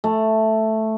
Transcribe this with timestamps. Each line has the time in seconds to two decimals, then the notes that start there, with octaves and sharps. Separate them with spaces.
0.04 A3